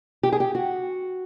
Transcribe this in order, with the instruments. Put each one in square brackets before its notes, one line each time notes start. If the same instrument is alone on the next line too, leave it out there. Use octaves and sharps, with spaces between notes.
[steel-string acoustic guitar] G4
G#4
G4
F#4